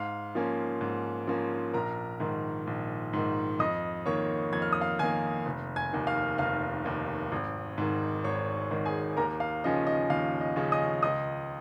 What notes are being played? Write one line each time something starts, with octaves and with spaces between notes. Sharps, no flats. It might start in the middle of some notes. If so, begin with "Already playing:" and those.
Already playing: G#2 F5
F3 A#3 C#4
G#2
F3 A#3 C#4
A#1 A#4 A#5
G#2 D#3
A#1
G#2 D#3
F2 D#5 D#6
D#3 A#3 C#5 C#6
F2 G#6
F6
D#6
F5 F6
D#3 A#3 G#5 G#6
F1
G#5 G#6
D#2 D#3
F5 F6
F1 F5 F6
D#2 D#3
G#1
G#2 D#3
G#1 C#5 C#6
G#2 D#3
G#4 G#5
D#2 A#4 A#5
F5
C#3 F3 C#4 D#5
D#5
D#2 F5
D#5
C#3 F3 C#4
D#5 D#6
C#2 D#5 D#6